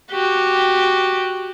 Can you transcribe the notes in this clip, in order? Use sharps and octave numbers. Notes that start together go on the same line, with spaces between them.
F#4 G4